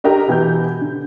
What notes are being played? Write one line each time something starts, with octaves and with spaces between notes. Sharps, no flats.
D4 G4 A#4 D#5 A#5
B2 E3 G4 G6
D3